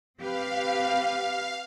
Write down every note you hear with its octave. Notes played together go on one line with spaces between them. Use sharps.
C4 G4 B4 F5